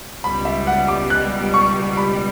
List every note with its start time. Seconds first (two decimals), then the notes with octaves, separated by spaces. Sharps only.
0.24 C#2 B2 G3 B5
0.45 E5
0.67 F#5
0.88 D6
1.10 F#6
1.54 C#6
1.97 B5